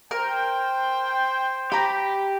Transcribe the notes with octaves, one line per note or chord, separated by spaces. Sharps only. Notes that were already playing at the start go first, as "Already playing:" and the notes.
A#4 C5 G5
G4 A#5 B5